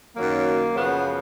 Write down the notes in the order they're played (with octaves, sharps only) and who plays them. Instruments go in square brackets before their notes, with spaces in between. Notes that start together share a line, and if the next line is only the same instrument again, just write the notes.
[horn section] F#2 D#3 F#3 A#3
F#2 C#3 F3 B3